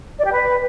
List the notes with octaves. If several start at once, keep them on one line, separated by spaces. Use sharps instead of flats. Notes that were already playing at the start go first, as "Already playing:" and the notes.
D5
G4
B4